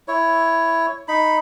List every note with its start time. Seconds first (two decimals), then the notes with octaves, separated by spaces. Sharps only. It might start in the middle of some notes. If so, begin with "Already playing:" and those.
0.08 E4 C#5
1.08 D#4 B5